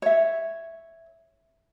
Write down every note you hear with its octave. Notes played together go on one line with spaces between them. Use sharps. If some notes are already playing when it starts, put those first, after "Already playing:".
C#5 E5